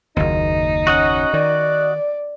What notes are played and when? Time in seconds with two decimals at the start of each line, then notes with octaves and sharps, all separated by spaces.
0.17 F#1 D#2 D#4
0.87 C#4 F#4 D#5 F#5
1.33 D#3 D5